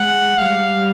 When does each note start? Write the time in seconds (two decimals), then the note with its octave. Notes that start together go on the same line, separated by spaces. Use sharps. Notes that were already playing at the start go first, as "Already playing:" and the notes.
Already playing: G#3 F#5
0.38 G3 F5